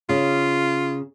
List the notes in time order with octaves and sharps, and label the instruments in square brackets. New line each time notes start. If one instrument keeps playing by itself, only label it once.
[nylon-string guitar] C#3 [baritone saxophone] F4